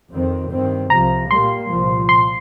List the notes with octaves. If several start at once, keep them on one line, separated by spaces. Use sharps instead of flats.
F2 D#3 C4
G2 D#3 C4
C2 C3 F3 A#5
A#2 G3 A#3 C6
C2 A#2 F3
A#2 C6